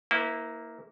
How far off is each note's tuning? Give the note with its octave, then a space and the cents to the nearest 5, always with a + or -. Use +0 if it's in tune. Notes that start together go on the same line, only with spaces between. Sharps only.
A#3 +0 E4 -20 B4 +45